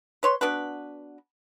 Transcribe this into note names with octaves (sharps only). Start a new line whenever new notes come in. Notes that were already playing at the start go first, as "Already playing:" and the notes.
B4 C#5 C6
B3 D4 F#4 B4